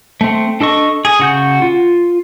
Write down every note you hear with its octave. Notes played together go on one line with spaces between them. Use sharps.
A3 C4
D4 A4 D#5 C#6
G#4
C#3 F#4 G6
F4